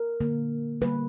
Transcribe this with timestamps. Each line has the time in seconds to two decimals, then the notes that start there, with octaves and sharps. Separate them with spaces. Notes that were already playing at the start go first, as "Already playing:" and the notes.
Already playing: A#4
0.20 D3 A#3
0.81 D3 G3 A#3 B4